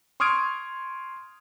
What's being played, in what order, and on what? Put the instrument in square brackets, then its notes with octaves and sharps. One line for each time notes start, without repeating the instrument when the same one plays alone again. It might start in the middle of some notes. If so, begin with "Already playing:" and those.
[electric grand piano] C6 C#6 D#6 F6 G#6 D7